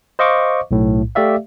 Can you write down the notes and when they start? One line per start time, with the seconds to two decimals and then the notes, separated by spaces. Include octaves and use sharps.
0.19 C5 D#5 F5 C#6 D6
0.71 B1 A2
1.15 A3 G4 D5 E5 F5